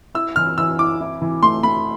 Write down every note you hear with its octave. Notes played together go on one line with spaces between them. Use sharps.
E4 E6
E3 F6
E3 E6
E4 D6
E4
E3
A3 C6
A3 B5